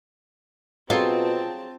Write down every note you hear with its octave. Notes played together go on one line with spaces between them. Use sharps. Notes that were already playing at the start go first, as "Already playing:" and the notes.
B2 F#3 C4 F4 G#4 A4 A5